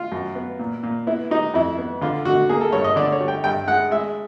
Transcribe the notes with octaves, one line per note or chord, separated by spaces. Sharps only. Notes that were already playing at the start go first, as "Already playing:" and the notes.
Already playing: F4
F#2
B3
A#2
A#2
B3 E4
G3 D#4
F2 E4
B3
D3 F4
D3 F#4
A#3 G#4
A4
G2 C#5
D#5
D3 D5
C#5
G3
G5
G2 G5
G#3 F#5
G#3 E5